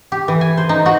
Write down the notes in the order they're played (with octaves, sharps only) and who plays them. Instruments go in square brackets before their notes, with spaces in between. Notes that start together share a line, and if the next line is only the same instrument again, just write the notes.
[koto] G4
E3
G#5
C5
D#4
F#4